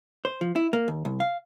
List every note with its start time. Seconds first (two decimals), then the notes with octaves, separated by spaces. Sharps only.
0.25 C5
0.41 F3
0.56 E4
0.73 A#3
0.88 D#2
1.05 C2
1.20 F5